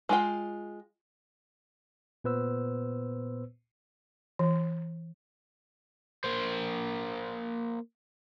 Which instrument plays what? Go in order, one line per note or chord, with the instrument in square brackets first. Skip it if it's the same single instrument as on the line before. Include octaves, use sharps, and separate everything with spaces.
[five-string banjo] G#3 F4 G5
[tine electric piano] A#2 B3 B4 C5 E6
[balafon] E3
[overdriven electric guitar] A#3 C5